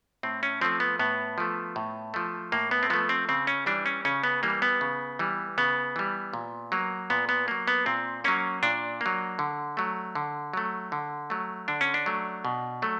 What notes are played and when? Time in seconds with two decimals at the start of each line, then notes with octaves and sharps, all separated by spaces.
0.23 A2 C4
0.43 C#4
0.61 F3 A3 C4
0.80 B3
0.99 A2 B3
1.38 F3 A3
1.76 A2
2.14 F3 A3
2.52 A2 A#3
2.71 B3
2.83 C4
2.90 F3 A3 B3
3.09 C4
3.29 C#3 C4
3.47 C#4
3.66 E3 G3 D4
3.86 C#4
4.05 C#3 C#4
4.24 B3
4.43 E3 G3 A#3
4.62 B3
4.81 C#3
5.19 E3 G3
5.58 C#3 B3
5.96 E3 G3
6.33 A#2
6.72 F#3 A#3
7.10 A#2 B3
7.29 B3
7.48 F#3 A#3
7.68 B3
7.86 A#2 C4
8.24 F#3 A#3 C#4
8.63 A#2 D4
9.01 F#3 A#3
9.39 D3
9.77 F#3 A3
10.15 D3
10.54 F#3 A3
10.92 D3
11.30 F#3 A3
11.68 D3 D4
11.81 C#4
11.94 D4
12.06 F#3 A3
12.45 B2
12.82 F#3 A3